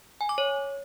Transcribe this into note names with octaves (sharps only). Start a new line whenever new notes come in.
G#5
D6
C#5